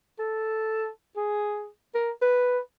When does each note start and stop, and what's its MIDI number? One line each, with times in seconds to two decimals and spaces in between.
0.19 0.88 69
1.16 1.68 68
1.95 2.11 70
2.22 2.59 71